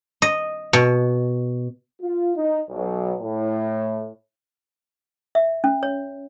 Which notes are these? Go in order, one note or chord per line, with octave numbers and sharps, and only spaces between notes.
D#5
B2
F4
D#4
B1
A2
E5
C#4
C#5